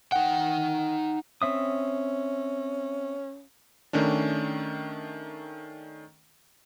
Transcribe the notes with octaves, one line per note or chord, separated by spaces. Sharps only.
D#4 F#5 G5
C4 C#4 E5 D#6
D#3 A3 C#4 D4